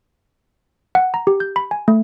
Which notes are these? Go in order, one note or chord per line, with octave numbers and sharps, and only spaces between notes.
F#5
A#5
G4
G6
B5
G#5
A3